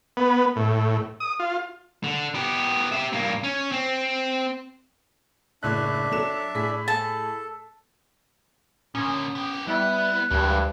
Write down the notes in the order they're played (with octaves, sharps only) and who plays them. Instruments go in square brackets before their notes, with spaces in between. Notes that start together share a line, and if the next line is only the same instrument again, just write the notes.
[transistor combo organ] B3
A2
D#6
F4
[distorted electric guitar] D3
B3 G4
G4 E5
G2 A#3
C#4
C4
[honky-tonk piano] F#1 A2 F#6 [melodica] D4 E5
[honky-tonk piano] F#3 A4 E7
A2 G#4 B6
[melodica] A4 [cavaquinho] A5
[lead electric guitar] A#2 D3 [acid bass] C#4 [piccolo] D#6
[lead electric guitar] B3 G4
[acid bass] G3 [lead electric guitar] B3 [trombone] E4 [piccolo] F#6
[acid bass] D2 [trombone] G2 [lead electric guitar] E3 G#3